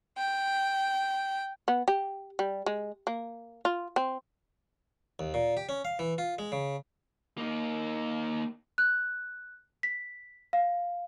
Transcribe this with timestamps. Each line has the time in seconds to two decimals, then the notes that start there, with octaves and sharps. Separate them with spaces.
0.17 G5
1.68 B3
1.88 G4
2.39 G3
2.66 G#3
3.07 A#3
3.65 F4
3.96 C4
5.19 D#2
5.34 A#2
5.57 G4
5.69 C#4
5.85 F5
5.99 E3
6.18 F4
6.39 G#3
6.52 C#3
7.38 A#3 D#4
8.78 F#6
9.83 B6
10.53 F5